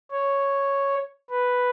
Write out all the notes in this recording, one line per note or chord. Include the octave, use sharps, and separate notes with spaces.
C#5
B4